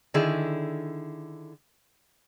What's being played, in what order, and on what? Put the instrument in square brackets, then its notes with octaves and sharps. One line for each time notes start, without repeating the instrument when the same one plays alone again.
[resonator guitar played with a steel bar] D3 D#3 E4 G#4